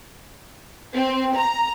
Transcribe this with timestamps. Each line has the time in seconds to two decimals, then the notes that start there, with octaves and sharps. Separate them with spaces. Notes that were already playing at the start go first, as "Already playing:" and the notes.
0.94 C4
1.37 A#5